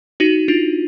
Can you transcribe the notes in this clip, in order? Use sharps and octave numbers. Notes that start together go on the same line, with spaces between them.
D#4 F#4
D4 F4